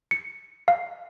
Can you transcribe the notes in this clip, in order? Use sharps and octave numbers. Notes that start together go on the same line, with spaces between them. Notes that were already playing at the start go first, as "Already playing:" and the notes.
C#7
F5